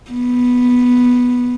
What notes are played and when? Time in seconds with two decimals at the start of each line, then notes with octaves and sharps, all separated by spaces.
0.12 B3